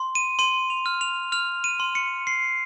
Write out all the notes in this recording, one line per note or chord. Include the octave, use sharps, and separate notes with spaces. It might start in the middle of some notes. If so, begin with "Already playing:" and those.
Already playing: C6
D#7
C6 D#7
F7
F6
F7
F6 F7
D#7
C6
C#7
C6 C7